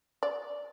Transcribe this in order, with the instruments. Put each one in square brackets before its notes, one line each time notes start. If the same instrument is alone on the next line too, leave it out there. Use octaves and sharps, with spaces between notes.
[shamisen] D5